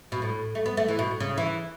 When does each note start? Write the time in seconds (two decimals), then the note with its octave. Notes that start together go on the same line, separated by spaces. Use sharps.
0.12 B2
0.22 A2
0.55 A3
0.66 B3
0.77 A3
0.88 E3
0.99 B2
1.20 C#3
1.38 E3